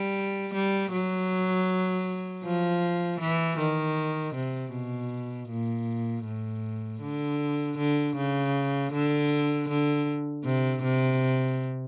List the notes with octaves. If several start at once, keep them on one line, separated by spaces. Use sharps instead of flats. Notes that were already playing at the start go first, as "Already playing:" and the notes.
Already playing: G3
G3
F#3
F3
E3
D#3
C3
B2
A#2
A2
D3
D3
C#3
D3
D3
C3
C3